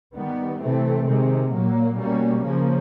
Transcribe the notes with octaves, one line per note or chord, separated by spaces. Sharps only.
D#3 G3 B3
C3 E3 A3 C4
C3 D#3 G#3
A#2 F#3 A#3
B2 G3 A#3 C#4
C#3 F3 A#3